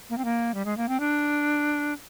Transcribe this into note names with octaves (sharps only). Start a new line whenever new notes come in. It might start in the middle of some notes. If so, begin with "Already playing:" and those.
A#3
C4
A#3
G3
G#3
A#3
C4
D4